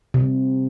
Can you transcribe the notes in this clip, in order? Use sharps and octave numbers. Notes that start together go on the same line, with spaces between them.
C3